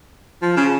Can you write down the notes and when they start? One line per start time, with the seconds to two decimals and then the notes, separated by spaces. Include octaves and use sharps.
0.42 F3
0.57 C#3